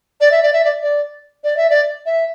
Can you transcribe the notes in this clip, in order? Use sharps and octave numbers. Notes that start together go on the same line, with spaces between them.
D5
E5
D5
E5
D5
D5
D5
E5
D5
E5